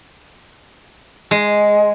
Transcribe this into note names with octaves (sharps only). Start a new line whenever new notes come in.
G#3